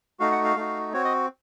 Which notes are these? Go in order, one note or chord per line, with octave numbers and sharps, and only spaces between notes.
A3 D#4 F#4 F5
F#5
F5
A3 D#4 F#4
C4 F#4 C#5
D#5